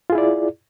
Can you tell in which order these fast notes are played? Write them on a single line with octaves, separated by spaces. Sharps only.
F4 G#4 E4 D5